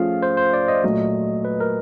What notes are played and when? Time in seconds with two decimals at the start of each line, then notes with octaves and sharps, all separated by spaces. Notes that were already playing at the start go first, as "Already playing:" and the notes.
Already playing: F3 A3 C#4 F4 G#4 F5
0.23 C5
0.37 C5
0.53 D5
0.68 D#5
0.84 A#2 F#3 A3
1.45 B4
1.60 A#4